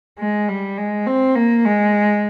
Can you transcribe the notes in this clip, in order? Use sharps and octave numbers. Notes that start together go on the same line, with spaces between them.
G#3
G3
G#3
C4
A#3
G#3